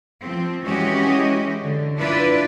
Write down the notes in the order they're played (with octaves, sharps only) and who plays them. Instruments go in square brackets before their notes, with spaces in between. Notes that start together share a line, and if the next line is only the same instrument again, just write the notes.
[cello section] F3 C4
E3 G#3 C#4 F#4 G4 D#5
D3
D4 E4 F4 B4 D5